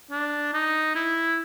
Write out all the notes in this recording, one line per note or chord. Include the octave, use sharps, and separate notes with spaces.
D4
D#4
E4